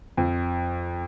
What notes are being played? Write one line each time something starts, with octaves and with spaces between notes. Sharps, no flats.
F2